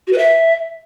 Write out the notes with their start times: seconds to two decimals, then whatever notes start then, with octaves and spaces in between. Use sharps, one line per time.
0.07 F#4
0.13 B4
0.18 E5